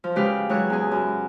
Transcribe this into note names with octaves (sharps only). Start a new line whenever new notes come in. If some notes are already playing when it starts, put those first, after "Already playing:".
F3
C#3 G#3 G4 B4 F5
E3 F#3 G#3 C#5 F#6
E2 G#4
F#2